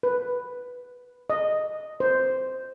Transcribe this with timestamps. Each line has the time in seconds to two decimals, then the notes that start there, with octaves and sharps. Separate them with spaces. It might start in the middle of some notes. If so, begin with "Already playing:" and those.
0.03 B4
1.30 D#5
2.00 C5